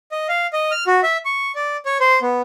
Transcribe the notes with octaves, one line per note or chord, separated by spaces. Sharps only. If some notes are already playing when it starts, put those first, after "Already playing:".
D#5
F5
D#5
F6
F#4
E5
C#6
D5
C#5
C5
B3